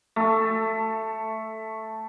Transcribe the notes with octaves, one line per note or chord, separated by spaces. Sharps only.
A3 A4